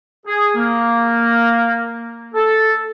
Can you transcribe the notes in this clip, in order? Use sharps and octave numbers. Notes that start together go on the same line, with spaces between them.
G#4
A#3
A4